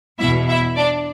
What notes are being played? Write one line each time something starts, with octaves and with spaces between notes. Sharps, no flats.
E2 B2 E4 E5
E4 E5
D4 D5